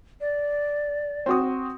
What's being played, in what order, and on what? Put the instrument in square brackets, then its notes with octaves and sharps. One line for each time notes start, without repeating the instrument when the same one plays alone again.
[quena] D5
[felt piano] C4 F#4 D#6